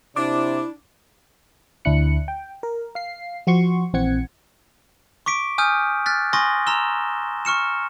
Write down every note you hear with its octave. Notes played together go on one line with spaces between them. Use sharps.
C3 D4 E4 D6
D2 D4 E4 F#6 C#7
G5
A#4
F5 C7
F3 F#4 C6 C#6
A#1 E3 C4 F#5 G#6 C#7
C#6 D6 B6 D7
G#5 D#6 F6 G6
F6 F#6 A6 B6
G#5 C6 C#6 D#6 A#6
A#5 C6 E6 E7 G7
C#6 F6 C#7 E7